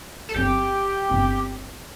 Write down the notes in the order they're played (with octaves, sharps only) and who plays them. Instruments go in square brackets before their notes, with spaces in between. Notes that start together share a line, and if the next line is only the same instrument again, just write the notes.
[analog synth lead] A4
[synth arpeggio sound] G1 G2 F#3 C4 [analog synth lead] G4
[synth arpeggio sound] G1 G2 F#3 C4